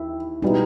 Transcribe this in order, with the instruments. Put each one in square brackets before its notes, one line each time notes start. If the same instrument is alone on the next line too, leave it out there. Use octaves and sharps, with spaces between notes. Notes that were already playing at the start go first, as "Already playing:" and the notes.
Already playing: [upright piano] D#2 [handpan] E4
[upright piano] B2 G3 B3 E4 [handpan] D#4